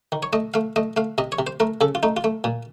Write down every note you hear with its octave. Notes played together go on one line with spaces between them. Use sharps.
D#3
C#5
A3 D#5
A3 F5
A3 D#5
A3 F5
C3 D#5
C#5
C3
C5
A3 A#4
C#3 A4
F4
A3 D#4
F4
A3
A#2